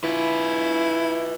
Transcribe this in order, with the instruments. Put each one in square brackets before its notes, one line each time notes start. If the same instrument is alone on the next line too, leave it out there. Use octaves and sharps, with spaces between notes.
[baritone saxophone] E4 [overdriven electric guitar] F4 B4